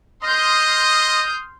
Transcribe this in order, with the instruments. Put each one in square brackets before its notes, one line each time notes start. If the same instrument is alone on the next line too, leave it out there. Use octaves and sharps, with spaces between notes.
[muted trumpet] D#5 [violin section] C6 F6 G6 [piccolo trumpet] D#6